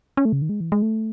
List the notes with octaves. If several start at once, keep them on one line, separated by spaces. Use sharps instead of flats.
C#4
A3
C#3
D#3
G#3
E3
G#3
A3